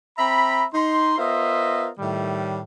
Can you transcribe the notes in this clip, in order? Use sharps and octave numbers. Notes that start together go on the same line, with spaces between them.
C4 E5 A#5 B5
D#4 C6
B3 F4 A#4 C5 D#5 E5
A2 D#3 G3